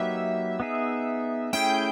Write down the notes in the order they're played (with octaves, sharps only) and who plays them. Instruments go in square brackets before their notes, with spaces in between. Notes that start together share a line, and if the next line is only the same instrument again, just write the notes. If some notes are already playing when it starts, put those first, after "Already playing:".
Already playing: [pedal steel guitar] F#3 A#3 D#4 G4 B4 [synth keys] E5
[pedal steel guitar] B3 D#4 G#4
[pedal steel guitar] A3 C#4 E4 G#4 [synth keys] G5